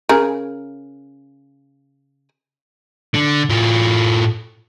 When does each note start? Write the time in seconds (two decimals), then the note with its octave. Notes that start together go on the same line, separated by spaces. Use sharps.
0.09 C#3 G#4 A#4
3.15 D3
3.50 A2 F4